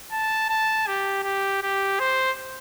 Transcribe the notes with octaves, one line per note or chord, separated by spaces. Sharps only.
A5
A5
G4
G4
G4
C5